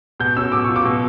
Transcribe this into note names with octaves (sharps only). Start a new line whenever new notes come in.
B2 G6
C#4 E6
B2 D6
F4 C#6
D6
B2